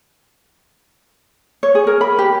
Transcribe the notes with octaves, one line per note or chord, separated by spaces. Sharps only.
C#5
G#4
A#4
B5
G4